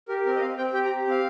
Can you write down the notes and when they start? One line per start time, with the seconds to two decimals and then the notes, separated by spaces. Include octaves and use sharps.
0.08 G4 A#4
0.26 C4 A#4
0.36 D#5
0.41 C4 F5
0.57 C4 G5
0.73 G4 G5
0.85 A#5
0.90 G4
1.07 C4 F5